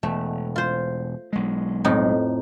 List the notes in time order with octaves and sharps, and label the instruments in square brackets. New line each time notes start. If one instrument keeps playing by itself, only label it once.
[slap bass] E1 [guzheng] A3
[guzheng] F4 C5
[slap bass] B1 G#3
[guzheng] F2 A2 D#4